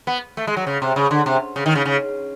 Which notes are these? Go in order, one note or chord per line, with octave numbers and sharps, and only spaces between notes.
B3
A3
G#3
F#3
C#3
C3
C#3
D3
C3
C#3
D#3
C#3
C#3